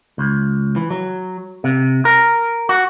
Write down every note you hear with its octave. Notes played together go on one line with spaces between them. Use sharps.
C#2
E3
F#3
C3
A#4
F#4